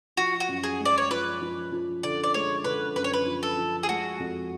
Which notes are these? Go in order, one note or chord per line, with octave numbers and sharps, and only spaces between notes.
F3 F#4
F#4
F#2
G#4
G#3
D5
C#5
F3 B4
F3
F3
D3 D5
D5
G#3 C#5
D3 B4
F#2 B4
C#5
B4
F3
A4
F3
G#4
G#3 F#4
F2